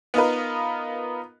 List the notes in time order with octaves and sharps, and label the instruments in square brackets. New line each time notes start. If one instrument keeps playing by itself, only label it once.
[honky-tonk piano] B3 D#4 F4 A#4 B4